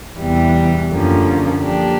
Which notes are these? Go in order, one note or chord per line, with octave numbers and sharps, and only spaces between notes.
E2 C3 E3 G3
F#2 D3 F3 A#3 C#4
F3 A#3 D4 G4